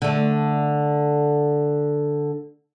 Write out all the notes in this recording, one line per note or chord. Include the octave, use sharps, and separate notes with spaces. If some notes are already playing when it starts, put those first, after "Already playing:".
D3 A3